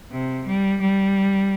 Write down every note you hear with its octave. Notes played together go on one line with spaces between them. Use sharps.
C3
G3
G3